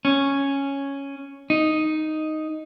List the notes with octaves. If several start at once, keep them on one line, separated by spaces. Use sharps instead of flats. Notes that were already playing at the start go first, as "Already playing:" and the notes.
C#4
D#4